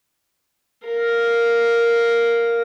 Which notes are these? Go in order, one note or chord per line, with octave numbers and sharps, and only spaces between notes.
A#4 F5